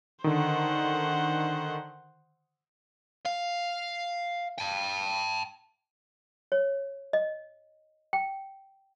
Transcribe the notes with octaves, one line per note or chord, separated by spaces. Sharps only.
D3 D#3 C5 F#5
F5
G5 A5
C#5
D#5
G5